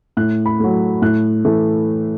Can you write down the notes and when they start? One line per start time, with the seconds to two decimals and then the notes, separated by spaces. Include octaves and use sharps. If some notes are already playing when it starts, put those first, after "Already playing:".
0.17 A2 F#6
0.46 B5
0.60 F#3 A3
1.02 A2 F#6
1.45 E3 A3